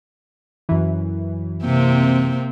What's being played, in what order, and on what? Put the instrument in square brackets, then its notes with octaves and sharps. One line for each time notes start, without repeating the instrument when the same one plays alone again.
[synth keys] F#2 E3
[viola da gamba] C3 A#3 C4